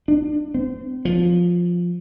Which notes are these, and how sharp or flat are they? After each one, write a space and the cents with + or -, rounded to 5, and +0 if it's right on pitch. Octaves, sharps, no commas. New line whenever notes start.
D4 +30
C4 -35
F3 +5